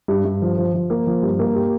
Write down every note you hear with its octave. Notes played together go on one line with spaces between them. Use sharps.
G2
G2
F3
F3
F3
A#3
F3
G2
A#3
G4